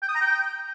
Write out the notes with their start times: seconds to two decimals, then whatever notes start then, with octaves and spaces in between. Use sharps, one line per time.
0.02 G5
0.09 D#6
0.15 A#5
0.21 G5